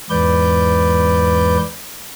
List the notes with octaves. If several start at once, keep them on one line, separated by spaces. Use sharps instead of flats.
E2 G#2 B4 D5 G6